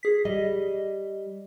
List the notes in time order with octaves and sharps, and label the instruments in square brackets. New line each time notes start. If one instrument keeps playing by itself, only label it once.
[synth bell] G#4 B6
[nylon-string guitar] G3 [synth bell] D#5